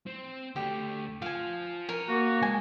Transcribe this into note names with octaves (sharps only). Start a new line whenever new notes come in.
C4
D2 A3 G4
F3 F5 G#5
A#4 C#5 G#5
A#3 F#4
G#3 G#5